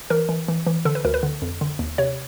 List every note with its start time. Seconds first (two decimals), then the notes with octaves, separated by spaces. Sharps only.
0.10 E3 A#4
0.29 E3
0.48 E3
0.67 E3
0.85 D3 A4
0.95 B4
1.05 D2 A#4
1.14 B4
1.23 D3
1.42 F2
1.61 D3
1.79 D#2
1.98 C3 C#5